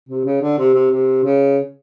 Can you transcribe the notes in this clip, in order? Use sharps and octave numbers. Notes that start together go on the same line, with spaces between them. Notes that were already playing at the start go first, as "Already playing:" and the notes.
C3
C#3
D3
C3
C3
C3
C#3